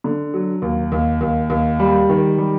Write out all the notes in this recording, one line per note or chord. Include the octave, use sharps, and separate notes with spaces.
D3
F#3
D#2
D#2
D#2
D#2
G3
D#3
G3